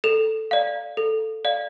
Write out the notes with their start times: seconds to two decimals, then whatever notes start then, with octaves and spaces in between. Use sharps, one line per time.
0.04 A4 E7
0.51 D5 F5
0.97 A4
1.45 D5 F5